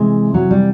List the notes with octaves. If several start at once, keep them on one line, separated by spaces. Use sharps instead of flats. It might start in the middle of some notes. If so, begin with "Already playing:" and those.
Already playing: C3 E3 G#3
F#3
G3